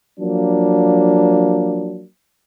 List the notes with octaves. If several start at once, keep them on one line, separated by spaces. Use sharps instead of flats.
F3 F#3 A#3 D4